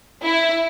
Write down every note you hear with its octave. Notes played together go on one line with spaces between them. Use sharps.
E4